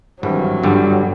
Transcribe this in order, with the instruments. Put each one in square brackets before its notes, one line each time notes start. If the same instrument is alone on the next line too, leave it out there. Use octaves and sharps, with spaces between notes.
[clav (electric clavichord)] G#1 G2 E3 [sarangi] F#3
[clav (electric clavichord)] G1 G2 D3 G3